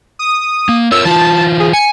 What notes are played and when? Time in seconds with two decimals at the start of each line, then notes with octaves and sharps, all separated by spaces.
0.19 D#6
0.69 A#3
0.92 F4 A#4 C#5 E6
1.05 E3 F4 A5
1.60 G#4
1.73 G#5 C#7